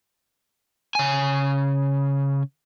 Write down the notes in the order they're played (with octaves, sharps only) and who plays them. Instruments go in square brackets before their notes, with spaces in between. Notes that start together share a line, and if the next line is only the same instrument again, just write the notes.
[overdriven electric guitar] C#3 G#5